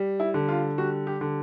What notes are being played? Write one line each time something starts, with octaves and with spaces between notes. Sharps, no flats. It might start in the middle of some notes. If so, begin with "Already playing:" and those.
Already playing: G3
E4
D3
F4
G3 F#4
G4
D3